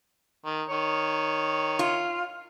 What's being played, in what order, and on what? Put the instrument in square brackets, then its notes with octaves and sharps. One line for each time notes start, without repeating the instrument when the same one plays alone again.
[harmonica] D#3
D#3 C#5
[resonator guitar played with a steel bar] F4